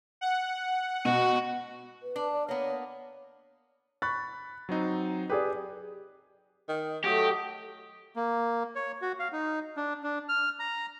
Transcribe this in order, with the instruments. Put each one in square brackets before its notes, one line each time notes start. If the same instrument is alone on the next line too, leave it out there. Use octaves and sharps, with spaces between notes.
[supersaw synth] F#5
[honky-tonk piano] B2 [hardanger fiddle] F#4
[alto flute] B4
[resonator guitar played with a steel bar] D4
[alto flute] D5
[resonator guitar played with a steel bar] A#3 B3 [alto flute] C#5
[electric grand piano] B5 A6 [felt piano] C#6 F#6
[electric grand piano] F#3 C4 D#4
[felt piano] G4 G#4 D5 [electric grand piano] B4
[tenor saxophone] D#3
[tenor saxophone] F#3 [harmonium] A3 D#5 [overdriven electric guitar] G4
[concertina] A#3
C#5
F#4
F5
D#4
D4
D4
F6
A#5